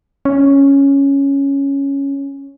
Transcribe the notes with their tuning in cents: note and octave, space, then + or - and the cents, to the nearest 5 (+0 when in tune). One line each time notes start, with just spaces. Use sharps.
C#4 +0